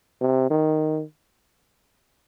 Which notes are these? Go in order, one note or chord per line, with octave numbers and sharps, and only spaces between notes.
C3
D#3